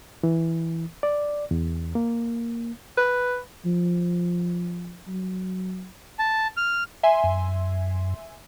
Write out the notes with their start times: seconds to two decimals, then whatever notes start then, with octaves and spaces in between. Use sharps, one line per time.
0.23 E3
1.03 D5
1.51 E2
1.95 A#3
2.98 B4
3.65 F3
5.07 F#3
6.19 A5
6.57 F6
7.03 E5 G#5 C6
7.24 F#2